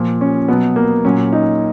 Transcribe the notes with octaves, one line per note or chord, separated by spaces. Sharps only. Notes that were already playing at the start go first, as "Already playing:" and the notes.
Already playing: A#2 F3
C#4
B2 F#3 B3
A#3
A#2 F#3 C#4
D#4